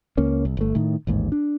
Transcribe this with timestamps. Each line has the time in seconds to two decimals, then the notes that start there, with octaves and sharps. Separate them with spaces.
0.17 C#2 A#3 C#4
0.45 C2
0.57 G1 A3
0.75 A2 D#3
1.07 A1 D#2 G#2
1.32 D4